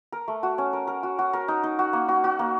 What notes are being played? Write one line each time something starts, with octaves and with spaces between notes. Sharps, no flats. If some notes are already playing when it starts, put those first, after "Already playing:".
A#4
A3
F#4
C#4
A#4
A#4
F#4
F#4
A#4
D#4
D#4
F#4
A#3
F#4
F#4
A#3